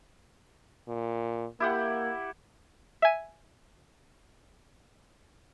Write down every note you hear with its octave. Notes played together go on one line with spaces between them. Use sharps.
A#2
A#3 E4 G4 F#5
E5 G#5